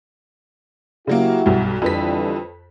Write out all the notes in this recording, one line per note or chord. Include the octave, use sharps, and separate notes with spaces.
C#3 F#3 A#3 E4 F#4 G4
B1 G2
F2 D3 E3 G3 B4 B6